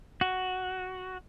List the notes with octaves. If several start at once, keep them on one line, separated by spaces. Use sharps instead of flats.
F#4